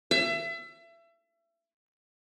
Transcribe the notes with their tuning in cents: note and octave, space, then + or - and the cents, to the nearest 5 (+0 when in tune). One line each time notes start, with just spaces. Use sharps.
E5 +30